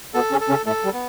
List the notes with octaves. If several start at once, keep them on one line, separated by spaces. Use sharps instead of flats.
B2 B3 A4
C#3 C#4
A4
C#3 C#4
A2 A3 A4
G3
B3